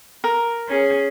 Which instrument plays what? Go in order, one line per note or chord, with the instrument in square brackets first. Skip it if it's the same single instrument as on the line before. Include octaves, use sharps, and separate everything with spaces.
[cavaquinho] A#4
[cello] C#4 G#4